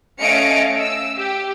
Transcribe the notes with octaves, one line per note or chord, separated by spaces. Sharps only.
A3 C#4 D#5 F5 C#7 D7
E6
G4